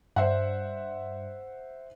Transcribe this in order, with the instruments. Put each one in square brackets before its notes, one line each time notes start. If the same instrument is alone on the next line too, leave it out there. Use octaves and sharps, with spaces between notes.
[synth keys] G2 [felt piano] C5 E5 F#5